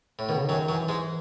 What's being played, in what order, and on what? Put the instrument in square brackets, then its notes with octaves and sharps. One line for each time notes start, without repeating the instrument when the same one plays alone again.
[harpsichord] A2
[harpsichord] B2 [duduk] D#3
[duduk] C#3
[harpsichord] F#2 F#3 [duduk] D#3
[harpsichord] F#2 F#3 [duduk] E3
[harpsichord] G#2 G#3